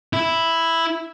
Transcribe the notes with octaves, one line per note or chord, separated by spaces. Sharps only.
E4